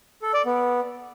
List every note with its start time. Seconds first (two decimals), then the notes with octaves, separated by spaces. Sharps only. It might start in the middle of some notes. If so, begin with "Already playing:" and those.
0.22 A4
0.34 D5
0.45 B3